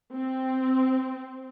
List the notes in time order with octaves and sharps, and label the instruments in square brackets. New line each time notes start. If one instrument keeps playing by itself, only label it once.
[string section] C4